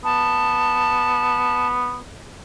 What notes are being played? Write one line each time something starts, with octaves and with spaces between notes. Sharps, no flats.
B3 A5